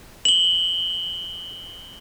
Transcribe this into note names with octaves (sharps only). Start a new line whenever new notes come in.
F#7 G7